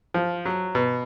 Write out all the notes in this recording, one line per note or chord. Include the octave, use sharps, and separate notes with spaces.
F3
F#3
B2